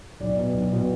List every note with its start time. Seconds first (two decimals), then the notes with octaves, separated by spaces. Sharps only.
0.20 B1 D5
0.37 B2
0.54 B1
0.72 B2